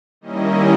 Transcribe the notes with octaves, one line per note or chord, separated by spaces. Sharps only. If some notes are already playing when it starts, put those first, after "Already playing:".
D#3 G3 A#3 C#4 E4 D#5